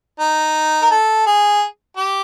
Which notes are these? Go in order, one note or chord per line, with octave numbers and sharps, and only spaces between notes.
D#4
A#4
A4
G#4
G4